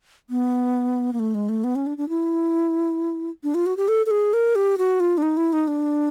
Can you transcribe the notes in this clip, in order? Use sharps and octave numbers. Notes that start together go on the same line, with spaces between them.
B3
A#3
A3
G#3
A3
B3
C#4
D4
D4
E4
D4
F4
F#4
G4
A4
A4
G#4
A#4
G4
F#4
F4
D4
D#4
E4
D#4
D4